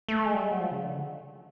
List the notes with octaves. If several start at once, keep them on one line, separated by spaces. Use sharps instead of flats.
A3
G#3
G3
G#3
F#3
F3
C#3
D3